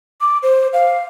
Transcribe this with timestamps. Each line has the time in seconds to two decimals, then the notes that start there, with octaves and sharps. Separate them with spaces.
0.21 D6
0.43 C5
0.73 F5